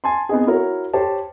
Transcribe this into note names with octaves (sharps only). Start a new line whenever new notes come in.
G#5 A5 C6
B3 C4 D#4 G#4
E4 F#4 A#4 C#5
G4 C5 C#5 A5